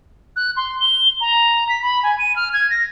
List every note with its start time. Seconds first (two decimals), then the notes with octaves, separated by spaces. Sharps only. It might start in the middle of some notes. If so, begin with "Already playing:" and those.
0.36 F#6
0.57 C6
0.80 G7
1.21 A#5
1.69 B6
1.82 B5
2.03 G#5
2.19 D#7
2.36 F6
2.53 G#6
2.70 A#6